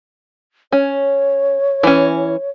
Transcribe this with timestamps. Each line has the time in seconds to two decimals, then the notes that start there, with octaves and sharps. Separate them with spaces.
0.72 C#4 C#5
1.83 E3 C#4